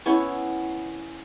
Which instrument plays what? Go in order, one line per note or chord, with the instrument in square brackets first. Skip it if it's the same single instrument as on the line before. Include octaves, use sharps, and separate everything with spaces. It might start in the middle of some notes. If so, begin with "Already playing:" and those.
[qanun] B3 C#4 E4